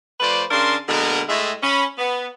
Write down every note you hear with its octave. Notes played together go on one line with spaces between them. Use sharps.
F3 A3 B4 C5 D5
C#3 D4 A#4 C6
B2 D3 G#3 A#3 B3 A#4
A2 G#3 E5
C#4 B5
B3